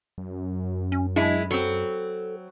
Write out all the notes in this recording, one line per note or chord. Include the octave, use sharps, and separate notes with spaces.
F#2
C#4
G#3 D4 E4
F#3 C4 A4